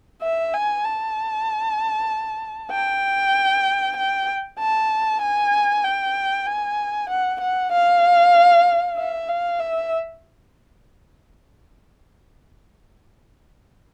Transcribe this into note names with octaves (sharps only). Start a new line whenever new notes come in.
E5
G#5
A5
G5
G5
A5
G#5
G5
G#5
F#5
F#5
F5
E5
F5
E5